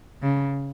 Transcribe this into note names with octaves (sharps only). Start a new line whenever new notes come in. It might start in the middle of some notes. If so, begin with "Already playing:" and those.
C#3